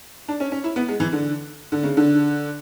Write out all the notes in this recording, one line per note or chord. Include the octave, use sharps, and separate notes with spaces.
D4
C#4
C#4
E4
B3
G#3
E3
D3
D3
C#3
D3